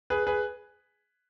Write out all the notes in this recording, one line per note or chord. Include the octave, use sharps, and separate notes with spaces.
G#4 B4
G#4 B4